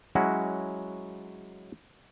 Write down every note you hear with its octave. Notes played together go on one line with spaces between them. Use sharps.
F#3 G#3 C#4 E4 F#4 F#5